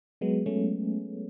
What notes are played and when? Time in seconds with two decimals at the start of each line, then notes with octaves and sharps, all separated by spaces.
0.21 F#3 G#3 B3
0.46 F#3 A3 C#4